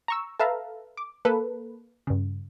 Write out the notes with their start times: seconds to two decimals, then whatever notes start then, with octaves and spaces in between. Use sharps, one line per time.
0.08 A#5 C#6 E6
0.39 A4 B4 E5 F5 A5 A#5
0.97 D6
1.25 A#3 A4 B4
2.07 G2 C#3